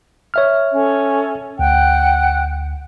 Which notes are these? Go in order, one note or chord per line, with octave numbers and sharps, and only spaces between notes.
C#5 E5 F6
C#4 A4
D2 F#5 G5 F#6